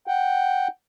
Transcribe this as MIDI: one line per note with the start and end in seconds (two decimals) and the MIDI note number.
0.07 0.68 78
0.07 0.68 79